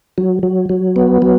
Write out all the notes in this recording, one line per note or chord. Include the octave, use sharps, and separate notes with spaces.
F#3
F#3
F#3
B3
F#3